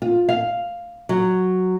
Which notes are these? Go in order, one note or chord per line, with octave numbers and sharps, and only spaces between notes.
F4
F5
F#3